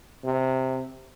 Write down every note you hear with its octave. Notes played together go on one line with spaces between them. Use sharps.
C3